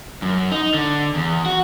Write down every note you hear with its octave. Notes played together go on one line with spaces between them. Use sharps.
F#2
D#4
D3
E2
F#4